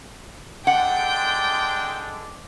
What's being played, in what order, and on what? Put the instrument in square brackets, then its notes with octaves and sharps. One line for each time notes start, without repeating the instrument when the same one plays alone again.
[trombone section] D3 G#3 D4 [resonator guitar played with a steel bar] F#5 [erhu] G5